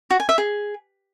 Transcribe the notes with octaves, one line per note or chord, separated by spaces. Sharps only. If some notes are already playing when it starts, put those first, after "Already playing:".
F#4
G#5
E5
G#4